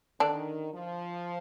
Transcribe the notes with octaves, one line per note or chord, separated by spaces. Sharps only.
D3 D#3 D4
F3